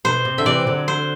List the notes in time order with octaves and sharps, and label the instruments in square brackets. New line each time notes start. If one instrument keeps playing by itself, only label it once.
[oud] B2 [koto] C5
[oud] C3
[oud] D3 [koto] E5
[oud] C3 E3 [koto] D5
[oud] D3 F#3
[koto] C5